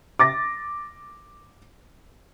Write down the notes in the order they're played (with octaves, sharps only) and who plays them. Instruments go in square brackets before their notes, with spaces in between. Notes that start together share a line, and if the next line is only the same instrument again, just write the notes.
[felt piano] D6 A6 A#6